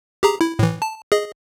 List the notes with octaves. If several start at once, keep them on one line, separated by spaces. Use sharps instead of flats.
G4 G#4 A#5
E4
A2 E3
A5
G#4 D#5